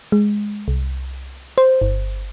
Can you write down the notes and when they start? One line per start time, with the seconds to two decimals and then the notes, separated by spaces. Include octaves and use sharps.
0.12 G#3
0.68 C2
1.58 C5
1.82 G1